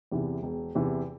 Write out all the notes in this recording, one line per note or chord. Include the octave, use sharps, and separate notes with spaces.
E2 C3 E3
E1
E2 C3 E3